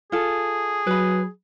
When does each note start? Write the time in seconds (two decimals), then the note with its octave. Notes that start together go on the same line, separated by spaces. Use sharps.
0.12 F4 G#4 A4
0.87 F#3 B4 B5